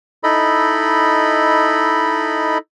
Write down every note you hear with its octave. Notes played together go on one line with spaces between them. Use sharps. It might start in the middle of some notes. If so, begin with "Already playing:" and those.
D#4 E4 A4 D#5 B5